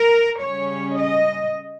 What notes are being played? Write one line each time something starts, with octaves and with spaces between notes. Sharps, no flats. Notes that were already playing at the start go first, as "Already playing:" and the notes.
Already playing: A#4
C#3 G3 C#4 C#5
D#5